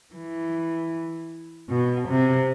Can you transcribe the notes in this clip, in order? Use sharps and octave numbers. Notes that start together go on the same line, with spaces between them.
E3
B2
C3